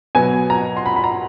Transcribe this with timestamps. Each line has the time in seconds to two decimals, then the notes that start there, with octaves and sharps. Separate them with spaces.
0.15 B2 F#3 B3 G#5
0.50 A#5
0.77 C6
0.86 B5
0.96 B5
1.04 A#5